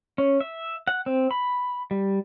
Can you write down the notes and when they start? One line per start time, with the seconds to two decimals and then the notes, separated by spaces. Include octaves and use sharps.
0.18 C#4
0.41 E5
0.87 F#5
1.06 C4
1.31 B5
1.91 G3